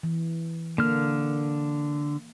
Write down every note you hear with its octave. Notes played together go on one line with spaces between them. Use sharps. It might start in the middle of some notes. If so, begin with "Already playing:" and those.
E3
D3 A#3 F6